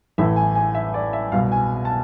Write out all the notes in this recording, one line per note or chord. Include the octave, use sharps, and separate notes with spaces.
A1 A2 E3 E5
G#5
G#5
E5
D5
E5
C2 B2 F5
G#5
A5